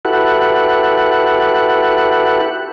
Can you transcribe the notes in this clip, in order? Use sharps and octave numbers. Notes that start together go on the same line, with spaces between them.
E4 F#4 G4 A4 B4 F#5